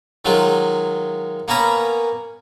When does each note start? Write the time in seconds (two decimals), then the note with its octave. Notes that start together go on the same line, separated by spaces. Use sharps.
0.25 D#3 F#3 G#3 F4
1.48 A#3 B3 C#4 A#5 B5